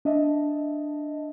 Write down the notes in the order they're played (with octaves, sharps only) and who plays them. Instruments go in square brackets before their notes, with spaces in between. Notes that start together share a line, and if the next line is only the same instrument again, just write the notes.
[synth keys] D4 D#5 E5 A5